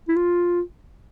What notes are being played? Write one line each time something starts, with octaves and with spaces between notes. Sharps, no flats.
E4
F4